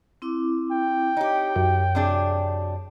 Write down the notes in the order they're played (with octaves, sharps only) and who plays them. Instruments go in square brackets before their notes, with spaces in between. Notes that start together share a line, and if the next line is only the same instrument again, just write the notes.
[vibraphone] C4 E4 D6
[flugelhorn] G5
[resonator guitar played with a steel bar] D#4 G4 [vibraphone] C#5
[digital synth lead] F#2
[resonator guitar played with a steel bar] C3 D4 G#4